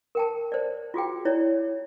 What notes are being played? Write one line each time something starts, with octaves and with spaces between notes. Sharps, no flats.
A#4 G5 A5
C5 D5
F4 F#4 G#4 G5
E4 C#5 D5